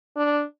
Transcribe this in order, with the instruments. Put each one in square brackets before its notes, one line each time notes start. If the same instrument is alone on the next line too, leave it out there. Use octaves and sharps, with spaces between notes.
[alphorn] D4